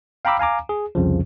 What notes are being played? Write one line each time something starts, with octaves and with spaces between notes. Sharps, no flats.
F5 G5 A#5 B5 D6 E6
F5 G#5 A#5 D6
G#4
C2 F2 C#3 F3